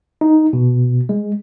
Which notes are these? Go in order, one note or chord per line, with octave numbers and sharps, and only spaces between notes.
D#4
B2
G#3